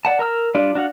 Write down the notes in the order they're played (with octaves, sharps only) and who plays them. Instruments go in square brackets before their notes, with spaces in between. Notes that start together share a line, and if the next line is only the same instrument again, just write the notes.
[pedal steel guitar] D5 F#5 A5
A#4 A#5 E6 F6
G3 D4 F4 D5
D4 F#4 F5 F#5